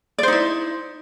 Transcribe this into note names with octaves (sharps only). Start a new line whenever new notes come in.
D#4 E4 C5 D5